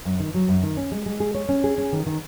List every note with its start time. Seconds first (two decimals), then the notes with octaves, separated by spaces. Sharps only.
0.05 F#2
0.20 D#3
0.35 F#3
0.49 F#2
0.63 D#3
0.77 C#4
0.92 G#3
1.06 G#3
1.20 G#4
1.35 C#5
1.49 C#4
1.64 G#4
1.78 C#4
1.93 D#3
2.06 D#3